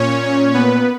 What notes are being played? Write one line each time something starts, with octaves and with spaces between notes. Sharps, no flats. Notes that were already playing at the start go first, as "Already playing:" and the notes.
Already playing: A#2 C#4 C#5
B3 B4